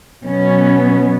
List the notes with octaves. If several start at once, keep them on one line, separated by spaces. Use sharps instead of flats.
B2 F#3 B3 C#4